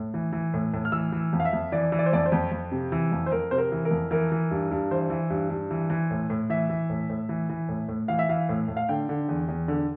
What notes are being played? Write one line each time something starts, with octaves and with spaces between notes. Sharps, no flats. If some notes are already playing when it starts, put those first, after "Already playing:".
Already playing: A2
E3
E3
A2
A2
F6
E3 E6
E3
F2
F5
E5
F2
E3 D5
E3
D5
C5
F2 D5
C5
F2
F2
C3
E3
F2
C5
F2 A#4
C3 C5
A#4
E3
A#4
F2
E3 A#4
E3
G2
G2
E3 C5
E3
G2
G2
E3
E3
A2
A2
E3 E5
E3
A2
A2
E3
E3
A2
A2
E3 F5
E5
E3 F5
A2
A2
F5
D3 G5
D3
E2
E2
D3